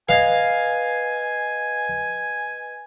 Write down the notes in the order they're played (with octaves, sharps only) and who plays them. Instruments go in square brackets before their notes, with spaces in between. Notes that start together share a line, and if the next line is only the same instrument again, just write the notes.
[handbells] B4 D#5 G#6 [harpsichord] F5 [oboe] G#5